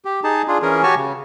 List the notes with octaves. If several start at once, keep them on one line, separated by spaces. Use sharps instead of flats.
G4
D#4 G#4 A5
D4 F4 G#4
E3 C#4 G#4 A#4
F#4 G4 C#5 G#5 A5 C#6
C#3